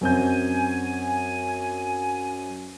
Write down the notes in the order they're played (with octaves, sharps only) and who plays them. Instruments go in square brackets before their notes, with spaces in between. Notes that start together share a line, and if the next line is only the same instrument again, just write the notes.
[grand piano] F#2 C4 G6 [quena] G#5